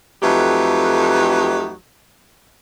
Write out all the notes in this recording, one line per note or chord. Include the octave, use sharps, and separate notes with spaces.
F2 F#3 A3 D#4 G4 B4